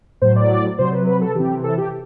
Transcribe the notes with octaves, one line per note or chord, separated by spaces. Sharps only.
A2 F#3 C5
D5
C3 F#3 C5
B4
B4
A4
C3 E3 G4
A4
G4